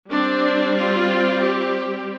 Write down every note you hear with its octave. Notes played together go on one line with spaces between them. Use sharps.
G3 C4 D4
F4
G4